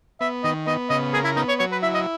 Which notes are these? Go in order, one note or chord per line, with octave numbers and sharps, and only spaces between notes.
B3 E5
D#3 D#5
B3 D#5
C#3 D#5
G#4 A#4
E4
B3 D#4
C#5
F#3 C#5
B4
E4 E5
D#5